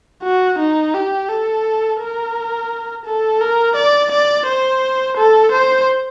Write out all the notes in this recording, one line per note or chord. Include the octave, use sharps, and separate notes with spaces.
F#4
D#4
G4
A4
A#4
A4
A#4
D5
D5
C5
A4
C5